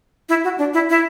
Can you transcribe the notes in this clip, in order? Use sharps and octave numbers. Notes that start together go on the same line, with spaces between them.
E4
F#4
D4
E4
E4